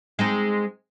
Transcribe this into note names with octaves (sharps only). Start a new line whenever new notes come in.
G#3 C4 D#4